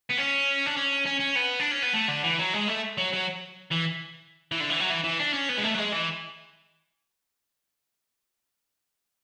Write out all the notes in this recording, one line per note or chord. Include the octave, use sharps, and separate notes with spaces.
B3
C#4
D4
C#4
C#4
C#4
B3
D4
C#4
B3
A3
D3
E3
F#3
G#3
A3
F#3
F#3
E3
E3
D3
E3
F#3
E3
E3
D4
C#4
B3
G#3
A3
F#3
G#3
E3